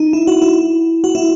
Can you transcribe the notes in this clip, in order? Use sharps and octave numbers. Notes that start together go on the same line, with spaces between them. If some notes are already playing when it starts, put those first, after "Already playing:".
Already playing: D#4
E4
F#4
E4
F#4
E4